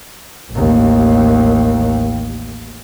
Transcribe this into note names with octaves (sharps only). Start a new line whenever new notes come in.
A1 D#2